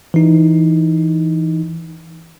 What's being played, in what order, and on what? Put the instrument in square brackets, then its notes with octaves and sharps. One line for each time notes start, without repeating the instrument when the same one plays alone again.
[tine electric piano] E3 D#4